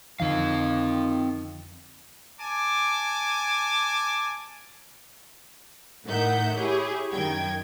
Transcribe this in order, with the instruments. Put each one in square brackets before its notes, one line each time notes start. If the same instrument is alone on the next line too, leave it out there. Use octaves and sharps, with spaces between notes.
[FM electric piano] F2 D3 F3 [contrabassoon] D#3 [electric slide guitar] C4 F5
[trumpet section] G#5 A5 D6
[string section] A2 D#3 E5 F#5 G6
E4 G4 G#4 C#5
F#2 D#3 G5 G#6